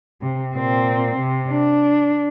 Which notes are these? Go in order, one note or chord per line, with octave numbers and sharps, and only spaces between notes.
C3
A#2 C4
C3
D4